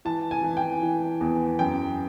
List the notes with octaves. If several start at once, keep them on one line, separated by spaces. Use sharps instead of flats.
E3 A5
G#5
E3
G5
E3
E2
F#2 G5